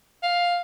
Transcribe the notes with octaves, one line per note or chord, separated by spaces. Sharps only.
F5